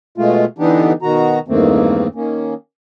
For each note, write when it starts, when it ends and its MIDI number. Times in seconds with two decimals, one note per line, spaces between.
0.18 0.45 47
0.18 0.45 56
0.18 0.45 57
0.18 0.45 65
0.59 0.92 50
0.59 0.92 52
0.59 0.92 59
0.59 0.92 62
0.59 0.92 63
0.59 0.92 67
1.02 1.39 47
1.02 1.39 51
1.02 1.39 66
1.02 1.39 82
1.48 2.07 40
1.48 2.07 43
1.48 2.07 51
1.48 2.07 57
1.48 2.07 58
1.48 2.07 60
2.15 2.54 51
2.15 2.54 58
2.15 2.54 61